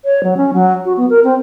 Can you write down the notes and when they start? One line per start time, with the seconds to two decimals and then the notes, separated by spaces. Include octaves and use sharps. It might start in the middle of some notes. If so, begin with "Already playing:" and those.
0.05 C#5
0.23 F#3
0.37 C#4
0.54 F#3
0.85 F#4
0.97 B3
1.10 A#4
1.24 C4